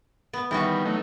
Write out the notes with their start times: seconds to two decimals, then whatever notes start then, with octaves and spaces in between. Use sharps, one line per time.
0.33 B3
0.51 D#3 E3 G3 B3 F#4
0.85 F#3 A3 D#4